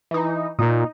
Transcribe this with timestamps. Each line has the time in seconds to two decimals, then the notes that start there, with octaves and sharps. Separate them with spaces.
0.11 E3 D#4
0.59 A#2 D#4